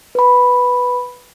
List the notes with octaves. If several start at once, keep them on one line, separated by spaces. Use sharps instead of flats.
B4 B5